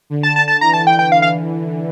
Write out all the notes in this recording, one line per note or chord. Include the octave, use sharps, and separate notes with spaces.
D3
A5
A5
A5
E3 A#5
A5
G5
G5
F5
F5